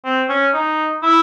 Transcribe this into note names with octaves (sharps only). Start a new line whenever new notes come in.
C4
C#4
D#4
E4